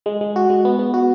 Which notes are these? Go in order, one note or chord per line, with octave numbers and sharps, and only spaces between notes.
G#3
G#3
F#4
G#3
B3
B3
F#4